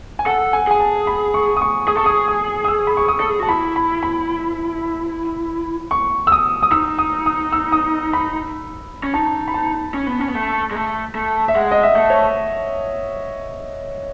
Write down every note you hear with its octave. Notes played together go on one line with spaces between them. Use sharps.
G#5
A4 F#5
G#5
G#4 G#5
A5
B5
C#6
D#6
C#6
G#4 D#6
A4 C#6
G#4 D#6
D#6
D#6
E6
B5
C#6
D#6
A4
G#4
F#4 A5
E4 B5
B5
B5
C#6
E6
D#6
D#6
D#4 E6
D#6
D#6
E6
D#6
B5
C#4
D#4 A5
B5
A5
C#4
B3
C#4
B3
A3
G#3
A3
A3
E5
G#3 F#5
D#5
E5
A3
C#5